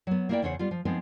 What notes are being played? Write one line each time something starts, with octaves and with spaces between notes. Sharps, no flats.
F#3 B3
A#3 B3 E4 A#4 D5 G5
E2 C#3 C5 C#5 E5 F#5
G3 B3 F4
F3
F3 G#3 B3 C4 D#4